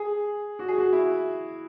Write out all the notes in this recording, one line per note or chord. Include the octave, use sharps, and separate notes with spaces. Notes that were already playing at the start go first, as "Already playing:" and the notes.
Already playing: G#4
F#4
G#4
F#4
E4